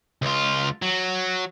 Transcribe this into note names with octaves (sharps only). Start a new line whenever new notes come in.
C#2 F4
F#3